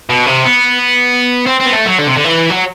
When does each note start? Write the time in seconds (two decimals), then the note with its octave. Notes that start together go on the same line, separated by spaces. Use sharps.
0.10 B2
0.26 C3
0.44 B3
1.47 C4
1.60 C4
1.66 B3
1.73 A3
1.86 F#3
1.99 D3
2.07 C3
2.16 D3
2.24 E3
2.50 F#3